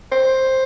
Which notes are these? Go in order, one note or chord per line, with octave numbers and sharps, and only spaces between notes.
C5